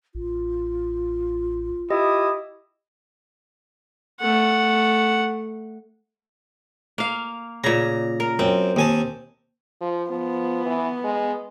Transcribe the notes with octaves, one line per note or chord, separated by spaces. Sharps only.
A1 F4
E4 G4 D#5 D#6
A3 F#5
A#3 F5
A#2 C#3 A#5
A#4
F#2 C4
D#2 G#5 A5
F3
F3 B3
E3
G#3